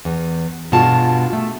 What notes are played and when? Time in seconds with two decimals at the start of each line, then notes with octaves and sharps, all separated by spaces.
0.05 E2
0.72 G2 B2 G#3 F4 A5
1.33 A3